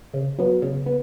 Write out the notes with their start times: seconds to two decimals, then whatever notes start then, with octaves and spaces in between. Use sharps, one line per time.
0.14 C#3
0.38 F#3 B3
0.62 C#3
0.86 B3